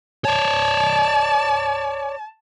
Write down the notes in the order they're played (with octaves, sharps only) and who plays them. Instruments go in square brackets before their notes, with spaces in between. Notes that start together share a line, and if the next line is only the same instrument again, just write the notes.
[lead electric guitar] C#5 D5 [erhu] A5